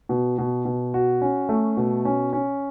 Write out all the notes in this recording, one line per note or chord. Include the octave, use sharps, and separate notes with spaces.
B2
B2
B2
F#4
C#4
A3
B2
C#4
C#4